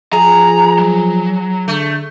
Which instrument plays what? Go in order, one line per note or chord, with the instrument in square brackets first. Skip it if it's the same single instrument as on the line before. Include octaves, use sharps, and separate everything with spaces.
[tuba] F3 [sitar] G#4 [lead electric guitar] A#5
[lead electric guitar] F#3
[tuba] D3 [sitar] A3